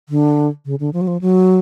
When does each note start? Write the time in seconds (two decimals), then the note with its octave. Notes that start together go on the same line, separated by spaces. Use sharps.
0.09 D3
0.65 C#3
0.80 D3
0.93 F3
1.01 F#3
1.07 F3
1.21 F#3